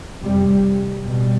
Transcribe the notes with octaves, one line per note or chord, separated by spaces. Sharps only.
F2 C3 G3
B2 G3